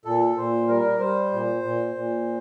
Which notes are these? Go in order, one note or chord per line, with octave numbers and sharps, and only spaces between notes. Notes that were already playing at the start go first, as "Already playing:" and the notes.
A#2 A4
A#2 C5
G3 A#4
G3 C5
A#2
A#2
A#2